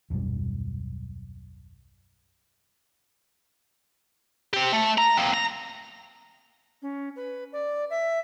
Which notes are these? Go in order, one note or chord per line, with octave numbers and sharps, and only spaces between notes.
D#1 B1 F#2 G3
C4 G4
A3
A#5
A#3 C4
A#5
C#4
B4
D5
E5